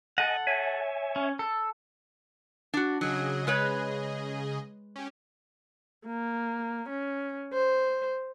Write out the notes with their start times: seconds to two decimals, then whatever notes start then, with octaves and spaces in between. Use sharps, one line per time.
0.18 A4 D#5 F#5 G#5
0.47 C#5 E5 G#5
1.16 C#4
1.39 A4
2.74 D4 F#4
3.01 C#3 F#3 G#4 D#5
3.47 G#3 B4 C#5
4.96 C#4 G4
6.06 A#3
6.89 C#4
7.53 C5